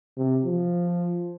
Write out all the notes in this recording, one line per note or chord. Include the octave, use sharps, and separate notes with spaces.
C3
F3